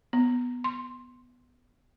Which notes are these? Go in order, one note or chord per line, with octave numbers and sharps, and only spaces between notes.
B3
C6